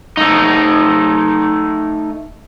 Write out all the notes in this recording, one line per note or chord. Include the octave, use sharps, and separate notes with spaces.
A3 D#4